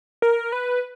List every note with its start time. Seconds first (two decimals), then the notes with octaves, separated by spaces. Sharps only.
0.22 A#4
0.52 B4